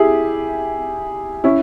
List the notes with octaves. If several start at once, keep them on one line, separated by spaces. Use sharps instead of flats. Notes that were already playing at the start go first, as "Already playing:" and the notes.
Already playing: E4 G4 G#4
C#4 E4